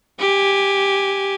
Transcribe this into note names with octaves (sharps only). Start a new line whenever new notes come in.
G4 G#5